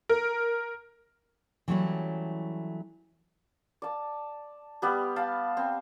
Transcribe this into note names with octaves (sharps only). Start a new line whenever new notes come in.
A#4
E3 F#3 G3 A3 C#4 E4
D5 A5
G3 B3 G4
F5 G5 A5
C4